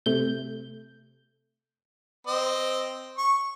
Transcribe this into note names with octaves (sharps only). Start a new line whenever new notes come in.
C3 A3 G6
C4 D#5
C#6